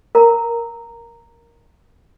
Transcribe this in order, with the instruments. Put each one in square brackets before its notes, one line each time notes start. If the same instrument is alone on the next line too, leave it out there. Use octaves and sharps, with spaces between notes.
[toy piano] A#4 A#5